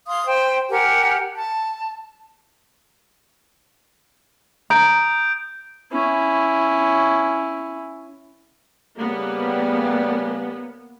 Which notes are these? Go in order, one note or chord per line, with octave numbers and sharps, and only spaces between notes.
F5 C6 D#6
C5 G5
G4 A#4 F#5 G#5
A5
A#5 D#6 G6 D7
C#4 E4
C#3 G3 A#3 B3